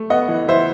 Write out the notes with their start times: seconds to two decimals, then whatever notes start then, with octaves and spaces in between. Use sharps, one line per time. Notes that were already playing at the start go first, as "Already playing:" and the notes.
Already playing: A3
0.10 B3 D#5 F#5
0.28 E3
0.48 E3 C5 E5